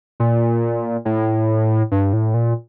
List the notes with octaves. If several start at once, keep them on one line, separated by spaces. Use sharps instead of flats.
A#2
A2
G2
A2
A#2